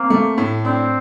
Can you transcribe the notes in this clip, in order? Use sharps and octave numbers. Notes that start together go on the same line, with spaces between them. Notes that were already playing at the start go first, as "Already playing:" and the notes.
Already playing: A#3 C4
A3
A2
C4 D4